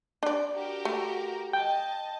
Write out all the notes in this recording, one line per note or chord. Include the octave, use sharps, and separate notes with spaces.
D4 D5
F#4 G4 A#4
A3
D#5 G5 A5